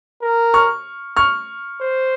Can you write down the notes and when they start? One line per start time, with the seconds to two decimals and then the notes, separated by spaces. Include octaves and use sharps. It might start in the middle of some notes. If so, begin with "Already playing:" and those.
0.22 A#4
0.54 C#6 F6
1.17 C#6 F6
1.81 C5